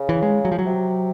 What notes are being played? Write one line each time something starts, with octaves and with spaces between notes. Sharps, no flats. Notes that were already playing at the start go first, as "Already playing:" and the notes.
Already playing: C#3
E3
G#3
F#3
F3
F#3
C3